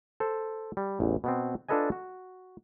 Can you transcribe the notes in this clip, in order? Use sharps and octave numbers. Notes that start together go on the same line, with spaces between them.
A4 C5
G3
A1 E2
B2 B3 C4
D4 F4 A4 B4 D#5 G#5
F#4